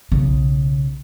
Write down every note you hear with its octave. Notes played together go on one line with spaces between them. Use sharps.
B1 C#3